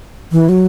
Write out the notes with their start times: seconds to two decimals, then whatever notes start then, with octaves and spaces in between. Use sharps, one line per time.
0.32 E3
0.49 F#3